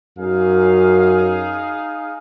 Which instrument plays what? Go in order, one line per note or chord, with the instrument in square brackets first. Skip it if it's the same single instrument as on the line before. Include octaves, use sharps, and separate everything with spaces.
[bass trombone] F#2 [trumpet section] D#4 G#4 F5